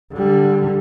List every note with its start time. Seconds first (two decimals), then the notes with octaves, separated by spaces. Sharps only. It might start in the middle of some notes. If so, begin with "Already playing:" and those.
0.14 D3 G3